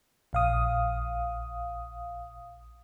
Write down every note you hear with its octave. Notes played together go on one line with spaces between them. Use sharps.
A#1 F5 D#6